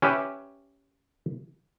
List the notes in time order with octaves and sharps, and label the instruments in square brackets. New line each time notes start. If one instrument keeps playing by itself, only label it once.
[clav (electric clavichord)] C#4 G4 B4 E5